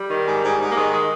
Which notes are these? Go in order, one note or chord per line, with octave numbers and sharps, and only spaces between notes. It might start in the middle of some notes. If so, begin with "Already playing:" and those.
Already playing: G3
D#3
G#2
G#2
G#2
A#3
D#3 G#3
G#3